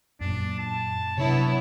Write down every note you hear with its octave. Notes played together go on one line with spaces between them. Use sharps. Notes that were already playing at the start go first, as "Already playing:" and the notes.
F#2 A#2 D4
A5
C3 F#3 B3 D4 E4 C#5